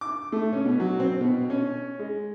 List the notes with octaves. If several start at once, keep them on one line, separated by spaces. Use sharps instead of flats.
D6
A3
C#4
B2
F#3
C4
B2
C#4
G#3